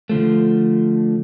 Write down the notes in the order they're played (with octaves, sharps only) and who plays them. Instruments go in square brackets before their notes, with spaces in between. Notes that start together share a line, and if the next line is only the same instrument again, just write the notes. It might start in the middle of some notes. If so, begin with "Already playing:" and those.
[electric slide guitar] D3 F3 A3